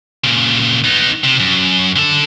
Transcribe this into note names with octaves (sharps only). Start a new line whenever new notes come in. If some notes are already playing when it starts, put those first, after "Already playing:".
A#2 C#3
B3 D#4
C3
F#2
D3 A4